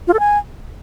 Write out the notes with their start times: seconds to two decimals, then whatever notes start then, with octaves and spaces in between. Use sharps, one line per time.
0.08 F4
0.14 A4
0.20 G#5